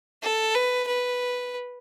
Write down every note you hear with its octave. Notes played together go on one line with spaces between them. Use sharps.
A4
B4
B4